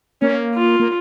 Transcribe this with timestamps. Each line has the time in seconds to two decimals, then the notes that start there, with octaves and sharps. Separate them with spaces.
0.21 A#3 C#4
0.55 F4
0.80 A#3